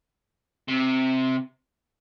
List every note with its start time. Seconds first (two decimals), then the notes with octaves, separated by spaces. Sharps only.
0.68 C3